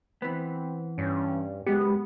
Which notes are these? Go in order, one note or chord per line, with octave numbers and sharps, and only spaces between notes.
E3 B3 C4
G2 C#4
F#1 G#3 B3 G4